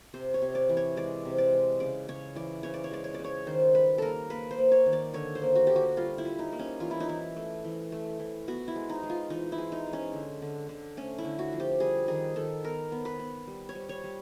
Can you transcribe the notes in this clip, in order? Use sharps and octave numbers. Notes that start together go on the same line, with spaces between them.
C3 C5
C#5
C3
D5
E3
C#5
G#3 D5
C3
D5
G#3
C#3 D5
C#3 C#5
E3 D5
C#3 C#5
D5
C#5
G#3 D5
C#5
C#3 D5
C#5
D#3 C5
G3 B4
A#3 A4 A#4
A#3 B4
C5
A#3
C#5
D#3
D5
D3 C#5
C5
A#3
F#4
D3 G4
F#4
G3 F4
E4
G3
D#4
A#3
C#4
E3 F4
E4
D#4
E3 E4
A3
E3
A3
E3
B3 F#4
E4
G#3
D#4
G#3
F4
E3 D#4
E4
G#3
D#4
G#3
C#4
D3
D3
D3
A3 C#4
E4
D3
F#4
F3
G4
G3 G#4
D#3 G#4
D#3 A4
B3 A#4
B3
B4
B3
G3
C#5
G3
C#5
G3